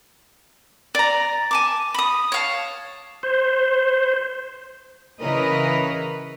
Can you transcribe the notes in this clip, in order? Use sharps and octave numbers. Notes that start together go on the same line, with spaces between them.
D5 A#5
G#5 A5 D6
B5 D#6
C#5 F5 A5
C5
C#3 E3 A#4 B4 C#5 D#5